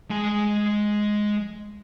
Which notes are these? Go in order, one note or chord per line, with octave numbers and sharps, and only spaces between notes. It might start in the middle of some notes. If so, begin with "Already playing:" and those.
G#3 G#5